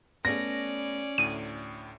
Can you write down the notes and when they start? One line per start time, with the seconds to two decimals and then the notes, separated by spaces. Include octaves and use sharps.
0.25 A3 B3 C#4 D5 A#6
1.18 D2 A2 D#7